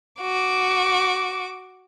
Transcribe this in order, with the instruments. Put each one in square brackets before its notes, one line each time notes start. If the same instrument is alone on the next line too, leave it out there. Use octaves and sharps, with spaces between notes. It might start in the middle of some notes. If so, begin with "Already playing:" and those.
[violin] F#4 D6